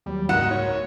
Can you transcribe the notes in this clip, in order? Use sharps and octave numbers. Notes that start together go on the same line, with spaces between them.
D#2 F#3 G3
F#1 C2 G#2 A#3 D#4 F#4 F#5 E7
C#5